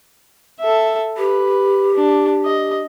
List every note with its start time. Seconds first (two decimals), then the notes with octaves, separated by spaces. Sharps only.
0.60 A4 E5
1.18 G4 B4
1.94 D4
2.45 D#5